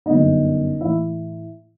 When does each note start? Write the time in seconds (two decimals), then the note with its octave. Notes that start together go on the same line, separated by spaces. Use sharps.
0.06 G1 F#2 D3 D#4 D#5
0.81 A2 E3 E4 E5